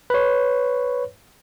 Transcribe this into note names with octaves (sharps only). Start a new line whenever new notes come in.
B4 C#5